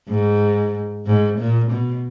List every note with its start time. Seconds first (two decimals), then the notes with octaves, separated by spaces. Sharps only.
0.09 G#2
1.06 G#2
1.39 A#2
1.71 B2